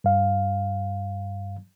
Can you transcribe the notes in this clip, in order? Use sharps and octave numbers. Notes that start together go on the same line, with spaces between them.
G2 F5